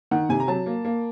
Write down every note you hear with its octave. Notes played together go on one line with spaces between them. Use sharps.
D#3 F#5
C3 G#5
A#5
F#3 A5
A#3
A#3